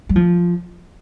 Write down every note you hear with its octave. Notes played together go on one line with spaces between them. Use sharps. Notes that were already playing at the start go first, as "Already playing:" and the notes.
G3
F3